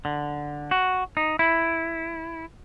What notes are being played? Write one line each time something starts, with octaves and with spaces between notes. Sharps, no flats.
D3
F#4
D#4
E4